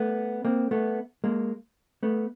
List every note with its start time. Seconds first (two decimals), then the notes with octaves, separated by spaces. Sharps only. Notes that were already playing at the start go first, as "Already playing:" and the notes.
Already playing: A3 B3
0.45 A#3 C4
0.71 A3 B3
1.24 G#3 A#3
2.03 A3 B3